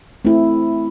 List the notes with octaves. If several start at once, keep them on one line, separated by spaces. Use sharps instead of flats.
A3 C4 E4